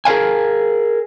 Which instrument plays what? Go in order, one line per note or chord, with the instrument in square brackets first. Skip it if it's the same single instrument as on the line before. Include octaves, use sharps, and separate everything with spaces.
[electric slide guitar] G#4 A#4 B4 F5 G#5